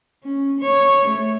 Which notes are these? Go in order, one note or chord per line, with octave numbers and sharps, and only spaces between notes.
C#4
C#5
A3